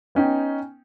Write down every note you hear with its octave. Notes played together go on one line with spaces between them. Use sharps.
B3 C#4 D#4 G5